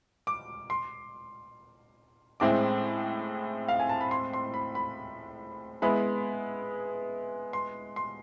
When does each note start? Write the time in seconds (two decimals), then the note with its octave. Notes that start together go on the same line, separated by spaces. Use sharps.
0.27 D6
0.70 C6
2.40 A2 G#3 C4 E4 D6
3.68 F5
3.80 G#5
3.89 A5
4.01 B5
4.11 C6
4.33 C6
4.54 B5
4.75 B5
5.82 G#3 B3 E4 B5
7.53 C6
7.96 C6